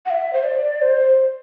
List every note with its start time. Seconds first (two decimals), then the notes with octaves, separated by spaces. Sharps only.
0.06 F#5
0.10 E5
0.33 C5
0.44 D5
0.82 C5